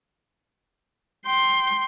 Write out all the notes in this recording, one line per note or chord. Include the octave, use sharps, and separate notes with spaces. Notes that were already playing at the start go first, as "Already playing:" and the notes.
G5 C6